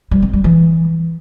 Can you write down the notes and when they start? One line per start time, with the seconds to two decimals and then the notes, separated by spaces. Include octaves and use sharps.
0.11 G3
0.22 C4
0.33 G3
0.44 E3